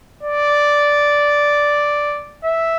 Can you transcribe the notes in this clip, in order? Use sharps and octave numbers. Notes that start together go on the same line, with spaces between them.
D5
E5